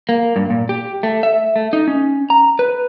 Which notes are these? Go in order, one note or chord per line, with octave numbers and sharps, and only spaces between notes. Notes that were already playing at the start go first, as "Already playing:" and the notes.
A#3
G2
A#2
G4
A3
E5
A3
D#4
C#4
A#5
B4